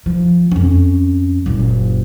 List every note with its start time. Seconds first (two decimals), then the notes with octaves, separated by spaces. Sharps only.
0.06 F3
0.52 F2 C#4
1.46 F#1 A#2